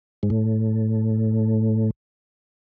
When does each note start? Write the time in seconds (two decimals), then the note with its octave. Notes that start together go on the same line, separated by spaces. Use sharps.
0.23 G#2
0.30 A2